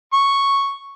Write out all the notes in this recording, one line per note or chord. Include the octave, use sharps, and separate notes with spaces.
C#6